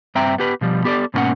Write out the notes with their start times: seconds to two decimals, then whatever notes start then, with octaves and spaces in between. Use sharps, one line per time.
0.15 G2 C4 E5 G5 A#5
0.38 B3 G4 B4
0.61 B2 F3 G3
0.84 B3 G4 A4 C5 D5
1.14 G#2 B2 D#3 A#3 C#4 F#5